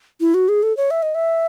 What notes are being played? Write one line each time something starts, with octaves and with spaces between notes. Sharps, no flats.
E4
F#4
G#4
A4
C#5
E5
D#5
E5